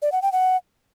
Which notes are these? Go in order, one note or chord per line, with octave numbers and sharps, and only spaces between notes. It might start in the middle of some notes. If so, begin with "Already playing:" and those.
D5
F#5
G5
F#5